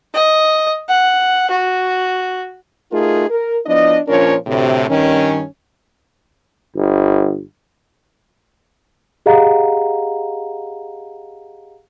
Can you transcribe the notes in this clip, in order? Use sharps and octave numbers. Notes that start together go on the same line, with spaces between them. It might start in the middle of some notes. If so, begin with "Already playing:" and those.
D#5
F#5
F#4
A3 D#4 F4 F#4 G#4 A#4
A#4
F3 B3 D4 E4 D#5
A#2 F3 C#4 D4 A#4 C#5
D2 A2 C3
G2 D#3 C#4
G1
G4 G#4 D#5 F5 F#5 A#5